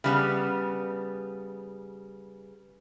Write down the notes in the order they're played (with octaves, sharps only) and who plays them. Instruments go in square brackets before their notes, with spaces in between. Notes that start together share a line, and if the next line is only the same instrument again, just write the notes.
[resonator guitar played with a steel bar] C#3 G3 B3